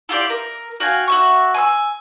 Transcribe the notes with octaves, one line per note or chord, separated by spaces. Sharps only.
E4 F4 G4 D5
A#4
F#4 F5 G5 G#5
F#4 E5 C#6
G#5 C6 E6